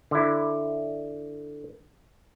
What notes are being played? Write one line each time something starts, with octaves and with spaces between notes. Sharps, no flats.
D3 E4